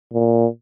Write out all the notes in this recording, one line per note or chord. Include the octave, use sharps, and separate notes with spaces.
A#2